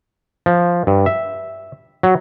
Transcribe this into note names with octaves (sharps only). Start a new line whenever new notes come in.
F3
G2
E5
F#3